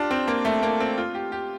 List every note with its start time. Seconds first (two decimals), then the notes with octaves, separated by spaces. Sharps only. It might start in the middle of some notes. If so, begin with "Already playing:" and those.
Already playing: D4 F4 G4
0.11 C4
0.28 A#3
0.45 A3
0.63 A#3
0.80 C4
0.98 F4
1.15 G4
1.32 G4